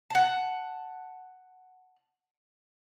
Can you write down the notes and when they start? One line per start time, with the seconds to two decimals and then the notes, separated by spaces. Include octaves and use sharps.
0.10 F#5 A5